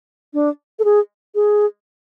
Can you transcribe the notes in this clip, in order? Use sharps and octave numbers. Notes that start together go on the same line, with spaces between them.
D4
A4
G#4
G#4